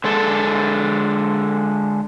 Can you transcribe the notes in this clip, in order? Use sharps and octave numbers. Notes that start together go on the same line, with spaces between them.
D3 G#3 A4